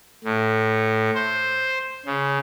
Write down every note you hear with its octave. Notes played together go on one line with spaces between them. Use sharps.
A2
C5
C#3